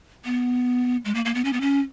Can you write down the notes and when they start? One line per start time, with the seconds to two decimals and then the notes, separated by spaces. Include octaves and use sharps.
0.25 B3
1.05 G#3
1.15 A#3
1.25 A#3
1.35 B3
1.45 C#4
1.53 B3
1.61 C#4